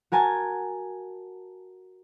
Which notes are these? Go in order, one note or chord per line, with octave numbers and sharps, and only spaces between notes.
F#4 A#4 G#5 A5